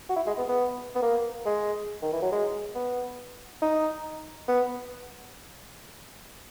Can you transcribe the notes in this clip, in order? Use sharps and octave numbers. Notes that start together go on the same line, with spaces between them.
F#4
E4
G#3
B3
B3
B3
A#3
G#3
D#3
E3
F#3
G#3
B3
D#4
B3